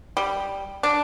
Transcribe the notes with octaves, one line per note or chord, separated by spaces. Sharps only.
G3
D4